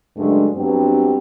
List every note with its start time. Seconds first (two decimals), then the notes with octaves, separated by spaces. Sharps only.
0.17 G2 C#3 F#3 G#3 A3 D4
0.56 G2 F#3 B3 C4 D4 G4